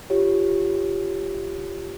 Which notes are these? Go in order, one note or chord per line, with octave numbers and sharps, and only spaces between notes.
F4 G4 C#5